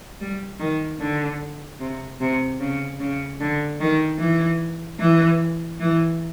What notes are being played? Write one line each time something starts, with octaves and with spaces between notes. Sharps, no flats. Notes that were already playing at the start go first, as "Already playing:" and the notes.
G3
D#3
D3
C3
C3
C#3
C#3
D3
D#3
E3
E3
E3